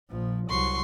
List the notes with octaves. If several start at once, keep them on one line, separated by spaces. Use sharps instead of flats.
A#1 F3
C2 F#3 C6 C#6